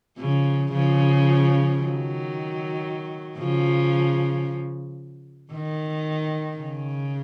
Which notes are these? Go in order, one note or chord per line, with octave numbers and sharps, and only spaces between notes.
C#3 F3
C#3 F3
D#3 F#3
C#3 F3
D#3
C#3